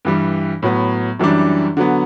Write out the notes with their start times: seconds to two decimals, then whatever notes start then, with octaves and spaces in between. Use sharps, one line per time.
0.05 G2 E3 G3
0.62 A2 F#3 B3
1.19 F#2 E3 G3 D4
1.77 D3 F#3 B3